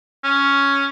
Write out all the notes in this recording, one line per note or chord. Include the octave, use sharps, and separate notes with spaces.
C#4